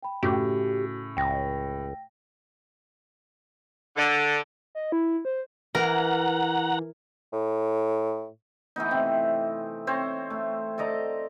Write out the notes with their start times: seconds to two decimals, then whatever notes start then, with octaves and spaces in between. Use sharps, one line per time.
0.03 G5 B5
0.23 A2 C#3 F#4 G4
1.17 C#2 G5 A#6
3.97 D3
4.75 D#5
4.92 E4
5.25 C5
5.75 E3 A#4 F#5 A#5
7.33 A2
8.76 E3 A3 B3 D#4
8.91 C3 C4
9.87 C4 C5 C#5
10.30 A3
10.78 A4 D5 D#5 A#5